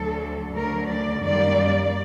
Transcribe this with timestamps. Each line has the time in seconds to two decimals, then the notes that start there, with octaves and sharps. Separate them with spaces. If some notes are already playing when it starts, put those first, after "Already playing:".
Already playing: D2 D3 F#3 A4
0.56 D2 D3 F#3 A3 A#4
0.90 D5
1.23 F#2 D#3 G3 A#3 D5